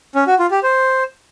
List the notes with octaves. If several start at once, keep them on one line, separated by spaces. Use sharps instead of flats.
C#4
F#4
F4
G4
C5